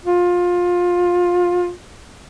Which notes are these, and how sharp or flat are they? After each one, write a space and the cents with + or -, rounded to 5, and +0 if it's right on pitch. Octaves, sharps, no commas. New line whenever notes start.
F4 +20